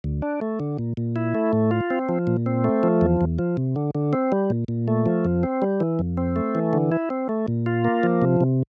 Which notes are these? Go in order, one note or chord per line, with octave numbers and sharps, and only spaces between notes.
D2
D4
A3
D3
A#2
A#2
E4
A3
A2
F4
C4
F3
A#2
C4
A3
F3
E2
E2
F3
C3
D3
D3
C4
G3
A#2
A#2
A3
F3
F2
C4
G3
E3
F2
C4
A3
E3
D3
E4
C4
A3
A#2
F4
A#3
F3
C3
C3